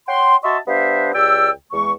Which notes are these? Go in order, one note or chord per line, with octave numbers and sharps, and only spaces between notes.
C#5 F#5 G5 C6
F#4 D#5 E5 A5 C6 C#6
G3 B3 D4 C5 E5 F5
C#2 G4 D5 G5 E6
E2 G#3 C#6